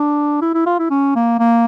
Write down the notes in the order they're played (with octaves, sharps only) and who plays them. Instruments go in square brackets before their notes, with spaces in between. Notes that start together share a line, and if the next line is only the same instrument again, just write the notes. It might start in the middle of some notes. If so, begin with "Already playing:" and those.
Already playing: [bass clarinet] D4
E4
E4
F4
E4
C#4
A#3
A#3